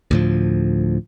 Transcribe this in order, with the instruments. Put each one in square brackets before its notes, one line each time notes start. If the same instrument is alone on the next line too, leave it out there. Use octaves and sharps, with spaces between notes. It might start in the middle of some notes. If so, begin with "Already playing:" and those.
[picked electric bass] D2 A2 F3